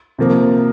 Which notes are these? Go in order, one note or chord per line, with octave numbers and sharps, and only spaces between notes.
C3 F3 A#3